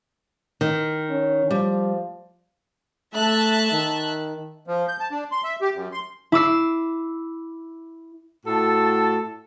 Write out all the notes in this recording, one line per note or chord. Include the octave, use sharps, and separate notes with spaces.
D#3
C#4
F3 G3
A3 E5 A5 F#6
D#3
F3
G6
A5
D4
C6
E5
G4
F#2
C6
E4 D6 E6 C7
A2 F#4 A4 A5